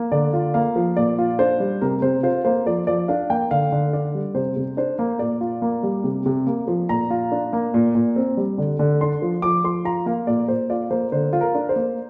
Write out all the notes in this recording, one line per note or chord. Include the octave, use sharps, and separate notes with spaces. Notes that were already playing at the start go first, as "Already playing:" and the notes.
Already playing: A#3
D3 D5
F4
A#3 F5
F3
A#2 D5
F4
D4 C5
G3
C3 A#4
C3 C5
F4 C5
A#3 C5
F3 D5
F3 D5
D4 F5
A#3 G5
D3 F5
D3
D4 D5
G3
C3 C5
C3
D4 C5
A#3
A#2 D5
F4
A#3
G3
C3
C3
A#3
F3
A#2 A#5
F4
D4
A#3
A#2
A#2
C4
G3
D3
D3
D4 C6
F3
F3 D6
F3 C6
F4 A#5
A#3 F5
A#2 D5
A#2 C5
F4 D5
A#3 C5
D3 C5
F4
A#4
D4
C5
A#3